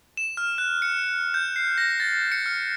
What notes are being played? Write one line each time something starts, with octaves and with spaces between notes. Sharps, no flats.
E7
F6
F#6
C#7
G6
C7
A#6
A6
C#7
F6